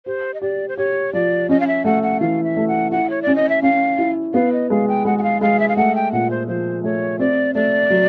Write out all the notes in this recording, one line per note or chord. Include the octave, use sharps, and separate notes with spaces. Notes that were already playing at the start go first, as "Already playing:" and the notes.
G4 C5
D#5
G4 D5
C5
G4 C#5
F3 D5
C#4 D#5
F5
E5
A3 F#5
F#5
E3 F5
E5
A3
F#5
E4 F#5
C#5
C#4 D5
D#5
E5
C#4 F5
E4
B3 F5
D#5
G#3 F5
G5
G#3 F#5
F#5
F5
G#3 F5
E5
F5
A3 F#5
G5
A#2 F#5
C5
F3 C5
A3 C#5
C4 D5
A3 D5
F#3